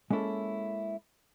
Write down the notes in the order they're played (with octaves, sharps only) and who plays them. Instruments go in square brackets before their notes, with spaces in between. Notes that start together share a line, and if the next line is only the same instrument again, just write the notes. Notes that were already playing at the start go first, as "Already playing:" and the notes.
[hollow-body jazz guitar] G#3 A#3 C#4 E4 A4